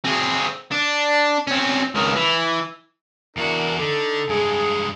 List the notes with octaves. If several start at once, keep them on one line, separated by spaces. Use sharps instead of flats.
C4 G#4
D4
C4 C#4
C#2 D#3
E3
E2 D4 E4 F#4 A#4
D3 D#4 A4
G2 G#3 G#4